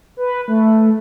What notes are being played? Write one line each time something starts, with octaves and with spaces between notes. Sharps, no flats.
B4
A3